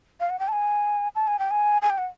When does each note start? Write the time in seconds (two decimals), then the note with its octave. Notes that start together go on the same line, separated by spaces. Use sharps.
0.20 F5
0.30 F#5
0.39 G5
0.48 A5
0.52 G#5
1.15 A5
1.27 G#5
1.39 G5
1.51 G#5
1.82 G#5
1.90 G5
1.98 F#5